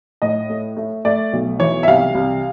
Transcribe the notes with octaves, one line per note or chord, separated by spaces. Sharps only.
A2 D#5
A3
A3
A3 D5
B1
E3 C#5
E5
C2 F5
C2